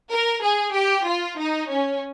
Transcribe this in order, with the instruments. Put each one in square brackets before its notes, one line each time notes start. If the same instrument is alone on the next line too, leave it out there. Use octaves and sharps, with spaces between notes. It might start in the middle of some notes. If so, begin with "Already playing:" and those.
[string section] A#4
G#4
G4
F4
D#4
C#4